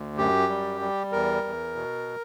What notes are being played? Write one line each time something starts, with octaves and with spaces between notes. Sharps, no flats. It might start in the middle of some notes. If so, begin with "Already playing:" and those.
Already playing: D2
F#2 G4
G3
G3
E2 A#4
E2
B2